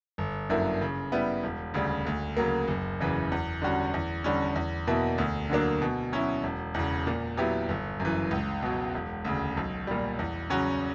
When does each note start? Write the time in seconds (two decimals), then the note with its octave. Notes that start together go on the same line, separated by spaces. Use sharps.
0.18 G1
0.50 F#2 D3 A#3 E4
0.81 C#3
1.12 G3 B3 E4
1.44 E1
1.74 D2 C#3 G3
2.07 D2
2.37 C#3 F#3 A#3
2.68 F#1
3.00 E2 C#3 E3
3.32 E2
3.62 D3 G3 C#4 F#4
3.94 E2
4.24 D3 G3 C#4
4.56 E2
4.87 B2 A#3 E4
5.18 D2
5.50 D3 F#3 A#3 D4
5.82 B2
6.12 F#3 C#4 E4
6.43 E1
6.74 E2 C#3
7.07 A#2
7.37 F#3 B3 E4 G4
7.69 G1
8.00 F#2
8.05 E3
8.31 C#2
8.63 B2 F#3
8.95 E1
9.25 D2 C#3
9.57 B1
9.87 A#2 G3
10.19 E2
10.50 C#3 F#3 C#4 F#4